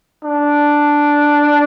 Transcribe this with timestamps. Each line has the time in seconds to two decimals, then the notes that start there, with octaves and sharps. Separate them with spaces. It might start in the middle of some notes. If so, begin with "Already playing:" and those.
0.24 D4